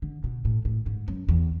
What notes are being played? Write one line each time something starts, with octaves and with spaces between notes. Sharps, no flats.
D3
B2
A2
A2
G#2
F#2
E2